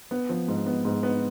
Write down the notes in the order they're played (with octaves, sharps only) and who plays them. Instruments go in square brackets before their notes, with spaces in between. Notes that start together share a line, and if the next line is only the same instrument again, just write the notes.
[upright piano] B3
F3
G#2
B3
G#2
B3